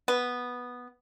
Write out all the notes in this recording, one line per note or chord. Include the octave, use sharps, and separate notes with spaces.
B3